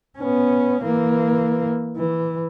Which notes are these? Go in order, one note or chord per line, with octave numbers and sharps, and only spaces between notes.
B3 C#4
E3 A#3
E3